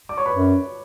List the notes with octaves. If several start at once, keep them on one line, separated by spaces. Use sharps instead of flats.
D5 D6
C#5 C#6
B4 B5
F#2